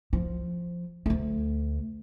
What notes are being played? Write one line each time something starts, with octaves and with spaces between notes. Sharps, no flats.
F3
D2 A3